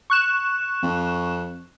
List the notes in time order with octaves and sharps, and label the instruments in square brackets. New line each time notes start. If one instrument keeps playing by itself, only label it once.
[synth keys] C#6 F#6 E7
[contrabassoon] F2